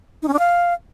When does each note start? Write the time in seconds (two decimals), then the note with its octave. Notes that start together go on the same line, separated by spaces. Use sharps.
0.22 D#4
0.28 C#4
0.33 D4
0.39 F5